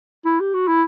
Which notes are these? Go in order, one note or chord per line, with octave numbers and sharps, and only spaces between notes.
E4
G4
F#4
E4